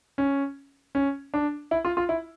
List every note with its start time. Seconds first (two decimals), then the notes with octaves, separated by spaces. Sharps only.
0.18 C#4
0.95 C#4
1.34 D4
1.71 E4
1.85 F4
1.97 F4
2.09 E4